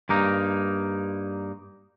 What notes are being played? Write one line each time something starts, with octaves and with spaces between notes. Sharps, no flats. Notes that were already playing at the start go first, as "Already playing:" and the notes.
G2 A#3 D#4